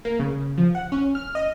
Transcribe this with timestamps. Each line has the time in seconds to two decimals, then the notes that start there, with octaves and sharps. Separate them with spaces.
0.05 A#3
0.19 C#3
0.58 F3
0.75 F#5
0.92 C#4
1.15 F6
1.35 D#5